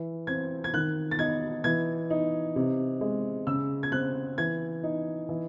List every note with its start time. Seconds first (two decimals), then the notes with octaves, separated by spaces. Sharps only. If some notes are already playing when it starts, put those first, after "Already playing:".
Already playing: E3
0.27 C4 G#6
0.64 G#6
0.74 D#3 F#6
1.11 A6
1.19 D#4 G#6
1.64 E3 G#6
2.10 D#4
2.56 C3
3.01 G#3
3.47 C#3 E6
3.83 G#6
3.92 C4 F#6
4.38 E3 G#6
4.84 D#4
5.29 E3